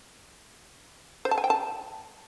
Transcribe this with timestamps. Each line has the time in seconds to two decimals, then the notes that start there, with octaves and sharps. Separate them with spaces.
1.25 C5
1.31 A5
1.38 G#5
1.44 G5
1.50 A5